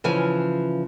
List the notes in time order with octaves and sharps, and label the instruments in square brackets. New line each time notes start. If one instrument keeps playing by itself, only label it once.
[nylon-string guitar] C#3 E3 F3 B4 G#5